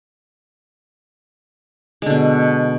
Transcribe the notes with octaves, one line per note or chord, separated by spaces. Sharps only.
B2 D3 G#3